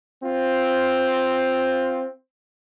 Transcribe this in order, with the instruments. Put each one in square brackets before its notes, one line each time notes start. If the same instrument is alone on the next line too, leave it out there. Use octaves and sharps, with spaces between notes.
[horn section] C4 F4